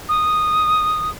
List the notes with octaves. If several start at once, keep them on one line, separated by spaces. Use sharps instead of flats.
D#6